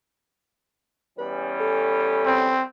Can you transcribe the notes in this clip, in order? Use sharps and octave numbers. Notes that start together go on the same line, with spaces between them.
E2 G3 C#4 B4
A4
C4